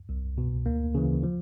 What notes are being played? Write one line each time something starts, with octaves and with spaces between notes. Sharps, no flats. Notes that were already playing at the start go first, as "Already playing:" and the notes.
C2
B2
D2 A#3
C#3 E3
F3